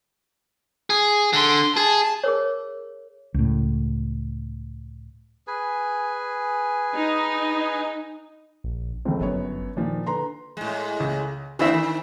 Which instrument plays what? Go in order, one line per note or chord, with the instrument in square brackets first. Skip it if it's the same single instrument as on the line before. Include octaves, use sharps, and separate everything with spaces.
[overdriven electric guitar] G#4
[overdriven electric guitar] D3 [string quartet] C6
[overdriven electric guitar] G#4 [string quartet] A5
[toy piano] G#4 A#4 C#5
[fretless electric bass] C#2 A2
[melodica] G#4 B4 G#5
[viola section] D#4
[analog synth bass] A#1
[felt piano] F1 C#2 [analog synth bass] C4
[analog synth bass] G1 [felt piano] F#2 B3 C#5
[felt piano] A#2 F3 [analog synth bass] D#3
[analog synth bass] D3 [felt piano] B4 A#5 C6
[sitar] A2 G#3
[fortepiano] C#2
[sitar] D3 B3 C4 [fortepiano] E3 E4 E5
[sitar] D#3